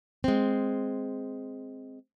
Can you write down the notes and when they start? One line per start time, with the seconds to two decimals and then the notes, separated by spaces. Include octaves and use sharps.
0.24 G#3 C4